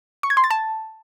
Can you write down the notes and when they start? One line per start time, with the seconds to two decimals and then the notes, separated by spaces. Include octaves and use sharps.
0.23 C#6
0.30 G#6
0.37 C6
0.44 A6
0.51 A5